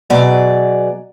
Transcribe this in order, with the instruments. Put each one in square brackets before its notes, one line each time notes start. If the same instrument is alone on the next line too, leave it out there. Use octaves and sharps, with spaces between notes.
[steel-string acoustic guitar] B2 F#3 G#4 D5